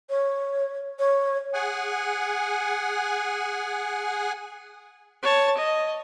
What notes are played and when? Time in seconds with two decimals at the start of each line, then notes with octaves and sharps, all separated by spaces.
0.09 C#5
0.99 C#5
1.54 G#4 F#5 G#5
5.22 C#5 A5
5.57 D#5